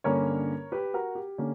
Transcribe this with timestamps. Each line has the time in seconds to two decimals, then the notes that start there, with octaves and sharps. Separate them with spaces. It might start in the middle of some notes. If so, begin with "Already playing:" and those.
0.04 G2 D3 A#3 C#4 A#4 C#5
0.72 G4 B4
0.94 F#4 A#4
1.15 G4
1.38 D3 A#3 C#4